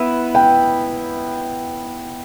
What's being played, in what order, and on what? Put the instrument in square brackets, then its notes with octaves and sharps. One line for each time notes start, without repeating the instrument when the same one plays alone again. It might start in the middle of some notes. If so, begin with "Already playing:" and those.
Already playing: [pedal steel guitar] B3 E4 B4 E5
[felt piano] G5